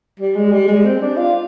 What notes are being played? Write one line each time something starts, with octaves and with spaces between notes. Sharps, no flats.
G3
G#3
G3
G#3
C4
D4
F4